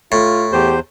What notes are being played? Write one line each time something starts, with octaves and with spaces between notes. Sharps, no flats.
A2 F4
E2 G4 C5